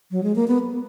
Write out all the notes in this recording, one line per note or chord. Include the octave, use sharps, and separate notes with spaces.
F#3
G#3
A#3
B3